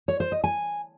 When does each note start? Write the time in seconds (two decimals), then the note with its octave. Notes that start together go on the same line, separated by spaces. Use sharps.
0.08 C#5
0.20 C5
0.32 D#5
0.44 G#5